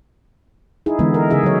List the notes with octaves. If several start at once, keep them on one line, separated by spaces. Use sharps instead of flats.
D#4 E4 G#4
D3 E3 G#3 B3
A#4
C#3 D#4 G#4 E5
F#3 C#5